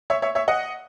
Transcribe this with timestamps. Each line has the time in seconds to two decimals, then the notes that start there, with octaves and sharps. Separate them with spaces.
0.10 C#5 E5
0.22 C#5 E5
0.35 C#5 E5
0.48 D#5 F#5